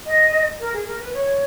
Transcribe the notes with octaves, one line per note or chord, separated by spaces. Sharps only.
D#5
A#4
G#4
A#4
B4
C#5